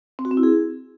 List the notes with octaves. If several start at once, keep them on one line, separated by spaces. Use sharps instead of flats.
C4
F#4
C4
E4
G#4